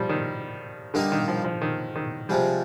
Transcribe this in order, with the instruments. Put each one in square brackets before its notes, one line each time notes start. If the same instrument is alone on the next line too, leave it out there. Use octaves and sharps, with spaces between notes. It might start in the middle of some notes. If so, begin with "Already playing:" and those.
Already playing: [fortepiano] F3 G3
D#3
[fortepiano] D3 [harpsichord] G3 A#3 D#4 G4 A#4
[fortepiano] D#3
F3
F3
D#3
D#3
[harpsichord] C3 F3 G#3 [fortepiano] G3